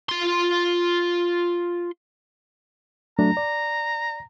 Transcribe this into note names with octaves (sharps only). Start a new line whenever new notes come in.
F4 C6
F#3 A3 D4 A#5
D5